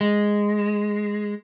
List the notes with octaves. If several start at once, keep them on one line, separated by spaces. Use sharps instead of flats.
G#3